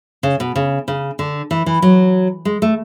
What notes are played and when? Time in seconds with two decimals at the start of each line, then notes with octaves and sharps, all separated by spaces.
0.23 C#3
0.40 B2
0.56 C#3
0.88 C#3
1.19 D3
1.51 E3
1.66 E3
1.82 F#3
2.45 G#3
2.62 A3